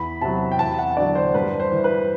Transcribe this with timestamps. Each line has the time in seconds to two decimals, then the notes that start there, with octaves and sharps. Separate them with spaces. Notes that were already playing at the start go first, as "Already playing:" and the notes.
Already playing: E2 B5
0.21 C3 F#3 A5
0.52 G5
0.59 E2 A5
0.79 F#5
0.97 D3 F#3 D5
1.15 C5
1.34 G2 B4
1.60 C5
1.72 E3
1.84 B4